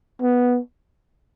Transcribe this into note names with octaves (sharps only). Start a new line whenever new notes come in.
B3